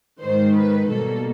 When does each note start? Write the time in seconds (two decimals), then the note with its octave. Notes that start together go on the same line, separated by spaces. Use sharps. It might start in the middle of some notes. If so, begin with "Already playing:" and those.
0.24 G#2 D#3 G#3 C5
0.56 B4
0.89 B2 G3 A#3 A4